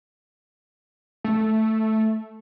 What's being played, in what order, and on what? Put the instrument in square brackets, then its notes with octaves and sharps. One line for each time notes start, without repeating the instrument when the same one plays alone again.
[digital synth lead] A3